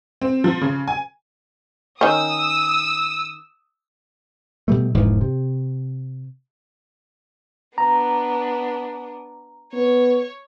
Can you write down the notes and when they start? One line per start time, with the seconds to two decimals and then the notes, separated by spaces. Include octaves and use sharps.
0.21 C4
0.44 F3
0.61 C#3
0.87 G#5
2.01 D#3 C#4 D#6 E6
4.68 B2 G3 A3
4.94 E1 G#2 E3 F3
5.21 C3
7.78 B3 D4 A#5
9.73 B3 C#5